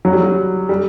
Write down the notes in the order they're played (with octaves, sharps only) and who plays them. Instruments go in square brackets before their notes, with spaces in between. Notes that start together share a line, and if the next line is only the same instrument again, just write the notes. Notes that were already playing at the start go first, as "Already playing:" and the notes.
[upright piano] F#3
G3
F#3
G3